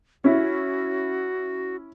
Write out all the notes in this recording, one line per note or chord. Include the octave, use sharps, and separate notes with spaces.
C#4 E4 F#4